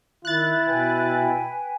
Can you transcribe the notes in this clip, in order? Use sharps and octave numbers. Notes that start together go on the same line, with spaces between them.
D#3 E4 F#6 A6
B2 B4 G5 G#5